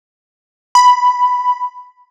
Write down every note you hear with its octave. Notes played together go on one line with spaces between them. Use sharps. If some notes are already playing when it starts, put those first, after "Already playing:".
B5